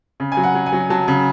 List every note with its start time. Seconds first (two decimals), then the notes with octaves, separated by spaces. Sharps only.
0.20 C#3
0.32 G#5
0.37 F#3
0.43 F#5
0.55 F#3
0.66 G#5
0.73 F#3
0.90 F#3 A5
1.08 C#3